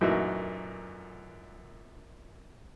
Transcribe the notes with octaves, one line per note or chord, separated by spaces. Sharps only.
F#2 A#2 E3 A3 D#4 F#4